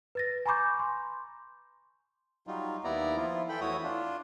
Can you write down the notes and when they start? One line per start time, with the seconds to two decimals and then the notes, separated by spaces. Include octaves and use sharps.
0.15 B4 A6 A#6
0.46 G#5 A#5 B5 C#6 D6 G6
0.79 C6
2.47 F#3 G3 D#4 F4
2.84 D#2 B3 E4 D5 A#5
3.17 F3 E4 F4
3.49 E3 A4 G5 B5
3.61 E2 A3 E4 F#4 C#5 D#6
3.83 D4 F4